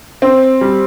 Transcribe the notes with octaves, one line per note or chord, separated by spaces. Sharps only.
C4
G3